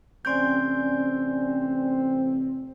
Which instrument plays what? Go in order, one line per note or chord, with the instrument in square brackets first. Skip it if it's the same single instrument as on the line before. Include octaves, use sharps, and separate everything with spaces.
[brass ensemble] A1 C3 C4 [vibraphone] C#4 D5 G#5 [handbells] C6 G6